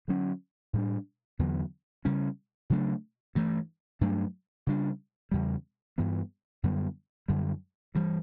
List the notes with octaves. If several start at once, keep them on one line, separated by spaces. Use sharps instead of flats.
D3 F#3 C#4
A2 G3 D4
E2 D3 F#3 B3
C#3 G3 C#4
C#3 F#3 A3 D4
G2 E3 A3
G2 F#3 A3 D4
C#3 G3 D4
E2 C#3 G3
G2 E3 B3
F#2 D3 G3 B3
F#2 D3 G3
G2 E3 G3